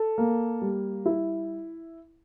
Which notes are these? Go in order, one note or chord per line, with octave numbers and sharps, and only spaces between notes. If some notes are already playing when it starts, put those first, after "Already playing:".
Already playing: A4
A#3
G3
E4